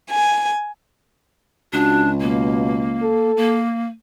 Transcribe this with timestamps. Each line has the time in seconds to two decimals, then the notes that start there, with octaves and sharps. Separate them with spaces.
0.10 G#5
1.73 C#2 D4 F#4
2.21 B2 A#3
3.02 A4
3.37 A#3